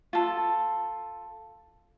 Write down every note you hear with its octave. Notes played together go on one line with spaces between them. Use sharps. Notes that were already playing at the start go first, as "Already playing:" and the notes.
F4 A4